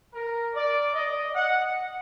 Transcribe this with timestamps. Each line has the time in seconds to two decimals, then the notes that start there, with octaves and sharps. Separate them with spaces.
0.13 A#4
0.54 D5
0.94 D#5
1.35 F#5